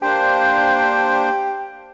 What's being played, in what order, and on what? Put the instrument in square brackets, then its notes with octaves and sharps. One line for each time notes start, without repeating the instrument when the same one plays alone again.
[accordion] A#3 D4 C5 [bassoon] G4